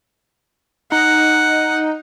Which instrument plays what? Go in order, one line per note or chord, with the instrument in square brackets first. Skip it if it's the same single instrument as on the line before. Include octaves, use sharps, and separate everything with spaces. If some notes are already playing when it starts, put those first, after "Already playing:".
[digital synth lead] D#4 [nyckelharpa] F#5